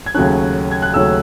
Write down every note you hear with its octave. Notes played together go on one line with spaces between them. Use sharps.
G#6
D#2 C#3 F#3 A3 C#4 F#6
G#6
F#6
D#2 C#3 F#3 A3 C#4 E6